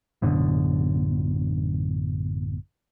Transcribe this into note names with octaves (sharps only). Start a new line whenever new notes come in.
A1 F#2 B2 D3